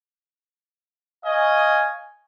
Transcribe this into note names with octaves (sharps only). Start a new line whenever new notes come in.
C#5 D#5 F5 G#5